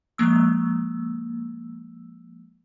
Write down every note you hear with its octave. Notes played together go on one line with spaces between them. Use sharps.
F3 G#3 A#3 E6